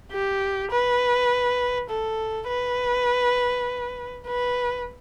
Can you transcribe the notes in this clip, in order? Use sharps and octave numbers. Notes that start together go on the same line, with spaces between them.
G4
B4
A4
B4
B4